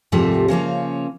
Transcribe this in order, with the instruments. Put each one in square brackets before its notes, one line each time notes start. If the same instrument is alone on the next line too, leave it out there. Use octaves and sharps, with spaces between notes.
[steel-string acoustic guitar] D#2 G#2 C3 F3 G3 A3
C#3 F3 A#3 C#4